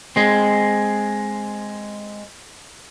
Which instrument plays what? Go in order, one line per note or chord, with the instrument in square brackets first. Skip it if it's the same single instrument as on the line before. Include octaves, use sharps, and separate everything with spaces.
[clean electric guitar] G#3 C4